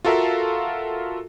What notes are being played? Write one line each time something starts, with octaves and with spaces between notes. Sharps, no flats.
F4 F#4 A4 A#4 E5 F5